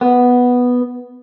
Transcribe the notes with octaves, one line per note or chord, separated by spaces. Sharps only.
B3